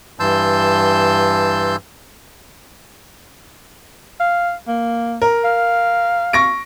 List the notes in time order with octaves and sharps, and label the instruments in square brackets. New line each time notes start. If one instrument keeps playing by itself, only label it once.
[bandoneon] G2 E3 A5 C6 E6 G6
[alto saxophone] F5
A#3
[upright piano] A#4
[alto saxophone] F5
[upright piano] C#6 A#6 D7